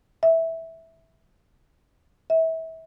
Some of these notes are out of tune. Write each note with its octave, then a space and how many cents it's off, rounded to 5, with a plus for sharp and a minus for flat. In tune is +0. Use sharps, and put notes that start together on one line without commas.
E5 -10
E5 -30